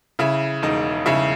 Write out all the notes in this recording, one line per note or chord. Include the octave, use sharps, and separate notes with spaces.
C#3 E4
E1 D#4
C#3 E4